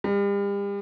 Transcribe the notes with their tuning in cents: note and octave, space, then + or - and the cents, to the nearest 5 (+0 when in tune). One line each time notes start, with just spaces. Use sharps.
G3 +40